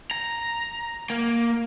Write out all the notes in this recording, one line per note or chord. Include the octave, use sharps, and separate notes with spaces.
A#5
A#3